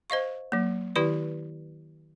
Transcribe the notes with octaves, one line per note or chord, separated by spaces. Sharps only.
C5 D#5 F5 C#6
F#3 A#3
D#3 E4 G4 B4 D5